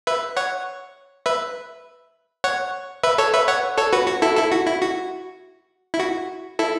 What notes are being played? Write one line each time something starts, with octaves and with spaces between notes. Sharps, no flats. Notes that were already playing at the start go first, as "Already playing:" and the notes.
B4 E5
C#5 F#5
B4 E5
C#5 F#5
B4 E5
A4 C#5
B4 E5
C#5 F#5
A4 C#5
F#4 B4
F#4
E4 A4
E4 A4
F#4
E4
F#4
E4
F#4
E4 A4